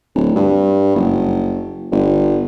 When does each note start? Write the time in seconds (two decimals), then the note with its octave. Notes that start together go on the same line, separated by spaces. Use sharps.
0.15 D1
0.36 G2
0.96 F#1
1.92 G1